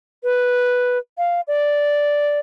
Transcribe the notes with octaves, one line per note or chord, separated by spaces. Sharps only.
B4
F5
D5